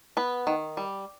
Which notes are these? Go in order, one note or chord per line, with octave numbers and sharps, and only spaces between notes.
B3 B4
D#3
G3